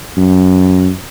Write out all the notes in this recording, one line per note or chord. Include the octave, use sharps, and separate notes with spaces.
F#2